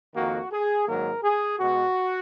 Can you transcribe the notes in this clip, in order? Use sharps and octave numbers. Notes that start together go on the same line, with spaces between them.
F2 D#3 A#3 F#4
G#4
G#2 D#3 F#3 A#3 A#4
G#4
B2 G#3 B3 F#4